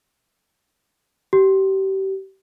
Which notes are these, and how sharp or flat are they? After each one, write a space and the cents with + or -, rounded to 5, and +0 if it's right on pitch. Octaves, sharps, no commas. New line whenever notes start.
G4 -30